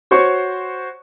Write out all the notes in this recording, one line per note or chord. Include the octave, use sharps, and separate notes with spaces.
F#4 C5 C#5 C#6